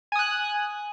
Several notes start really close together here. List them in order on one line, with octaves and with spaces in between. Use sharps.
G#5 D#6 F#6